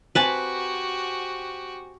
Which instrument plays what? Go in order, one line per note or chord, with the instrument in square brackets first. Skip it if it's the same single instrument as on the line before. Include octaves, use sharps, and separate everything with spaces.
[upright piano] C4 G#5 [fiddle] F#4 G4 [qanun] B4 A5